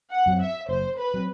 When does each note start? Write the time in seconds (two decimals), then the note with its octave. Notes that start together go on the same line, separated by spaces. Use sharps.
0.12 F#5
0.26 F#2 F#3 C4
0.41 E5
0.68 F#1 C5
0.98 B4
1.14 F#3 C4